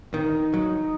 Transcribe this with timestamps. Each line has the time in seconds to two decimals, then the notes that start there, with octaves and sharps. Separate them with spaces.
0.14 D#3 D#4
0.54 F#3